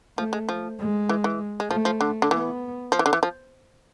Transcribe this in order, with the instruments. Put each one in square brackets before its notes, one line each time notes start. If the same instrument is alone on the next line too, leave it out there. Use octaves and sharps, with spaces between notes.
[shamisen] F3 [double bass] A3
[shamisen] G#3
F3
[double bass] G#3
[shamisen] E3
E3
G#3
[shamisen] F3 [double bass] A3
[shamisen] F3
D3
D3
[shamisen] E3 [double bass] B3
[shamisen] F3
E3
D3
E3
F3